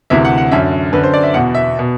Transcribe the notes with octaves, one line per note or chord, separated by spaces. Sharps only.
D2 C3 E3 E5
F#5
F#5
F#2 D3 E5
F#2 D3 B4
C5
D5
E5
E2 B2 F#5
E5
B2